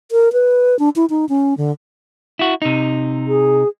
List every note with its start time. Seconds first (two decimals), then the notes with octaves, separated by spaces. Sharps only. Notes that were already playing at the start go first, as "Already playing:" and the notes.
0.12 A#4
0.33 B4
0.79 D4
0.96 E4
1.10 D#4
1.29 C#4
1.58 D3
2.39 E4 F#4
2.62 C3 D#4
3.28 G#4